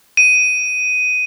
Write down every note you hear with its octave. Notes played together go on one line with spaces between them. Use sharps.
D#7